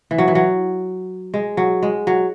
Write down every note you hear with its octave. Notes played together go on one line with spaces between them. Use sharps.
E3
F#3
E3
F#3
G#3
F#3
G#3
F#3